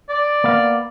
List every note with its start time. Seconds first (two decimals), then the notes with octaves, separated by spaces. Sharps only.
0.09 D5
0.44 A#3 B3 F5